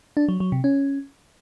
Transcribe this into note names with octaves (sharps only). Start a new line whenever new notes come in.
D4
F#3
F#3
C3
C#4